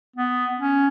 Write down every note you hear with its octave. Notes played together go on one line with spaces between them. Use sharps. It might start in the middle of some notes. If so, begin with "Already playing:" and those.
B3
C#4